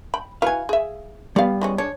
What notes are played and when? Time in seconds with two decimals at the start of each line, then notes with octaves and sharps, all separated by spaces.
0.14 G5 B5
0.42 E4 F#4 B4 F5 G#5
0.69 G#4 E5
1.36 G3 B3 D5 F5
1.61 E3 G#3 C#4
1.78 G#3 D4 C#5